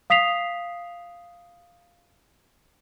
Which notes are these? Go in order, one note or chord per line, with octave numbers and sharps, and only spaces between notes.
F5 D#6 B6 C7 F7